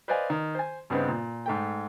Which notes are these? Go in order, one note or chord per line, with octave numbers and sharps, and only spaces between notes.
B4 C5 D5 D#5 F5 G#5
D#3
C5 G#5
G2 C#3 B3 C4 D#4
A#2
G#2 A3 G5